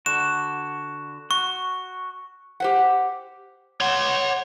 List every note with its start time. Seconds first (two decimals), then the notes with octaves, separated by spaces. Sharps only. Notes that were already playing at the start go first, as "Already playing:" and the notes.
0.06 D3 F#4 E7
1.31 F#4 C#6
2.60 G4 C5 F#5
3.81 C#5 F#5 C6